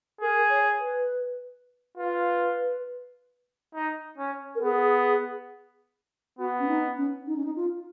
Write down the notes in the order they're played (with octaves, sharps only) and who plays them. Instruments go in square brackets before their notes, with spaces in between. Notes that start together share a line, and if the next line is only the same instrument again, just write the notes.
[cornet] G#4 [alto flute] A#4
[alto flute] C#5
B4
[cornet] F4 [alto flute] B4
[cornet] D#4
C#4
[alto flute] A#4
[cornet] B3 [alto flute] G#4
[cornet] B3 [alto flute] F#4
[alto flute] C#4
D#4
C#4
D#4
C#4
D#4
F4